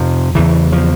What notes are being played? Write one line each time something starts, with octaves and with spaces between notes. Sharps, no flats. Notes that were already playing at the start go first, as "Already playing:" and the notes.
Already playing: F2 C3 F3
E2 C#3 E3
F3